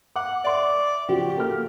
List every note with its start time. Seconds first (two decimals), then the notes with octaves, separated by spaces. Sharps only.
0.16 F#5 D6
0.44 D5 E5 C6 C#6
1.08 C#3 F3 F#4 G4
1.36 A#3 A4 F6